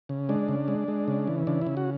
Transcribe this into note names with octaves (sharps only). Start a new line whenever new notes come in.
C#3
G#3 D4
C#3
G#3
G#3
C#3
E3
C#3 D4
E4
C#3
F#4